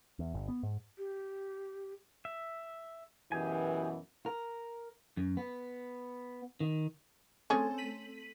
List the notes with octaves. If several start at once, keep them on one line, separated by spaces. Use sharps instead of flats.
E2
G1
B3
G#2
G4
E5
F#2 B2 E3 G4 G#4 G#5
A#4
F#2
B3
D#3
A3 C4 C#4 G#4 A4
B6 D#7 F#7